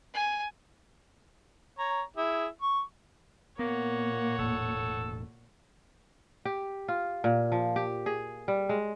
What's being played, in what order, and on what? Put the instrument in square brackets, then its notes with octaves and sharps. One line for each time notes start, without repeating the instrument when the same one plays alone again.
[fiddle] G#5
[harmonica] C#5 A#5
E4 G#4 E5
C#6
[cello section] A#2 [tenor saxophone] A#3 [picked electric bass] B3 [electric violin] C#5 F#5
[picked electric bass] E1 A2 [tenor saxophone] A4
[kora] G4
F4
A#2
F3
G4
G#4
G3
G#3